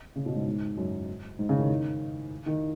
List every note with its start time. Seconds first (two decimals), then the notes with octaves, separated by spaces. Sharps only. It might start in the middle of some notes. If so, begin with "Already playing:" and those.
0.16 C#3
0.26 B2
0.36 G#2
0.46 G#2
0.77 F#2
1.39 G#2
1.49 C#3
1.59 D#3
2.46 D#3